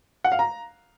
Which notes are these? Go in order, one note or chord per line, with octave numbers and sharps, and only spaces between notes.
F#5
F5
A#5